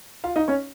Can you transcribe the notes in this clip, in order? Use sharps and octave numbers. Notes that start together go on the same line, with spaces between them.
F4 F5
D#4 D#5
C#4 C#5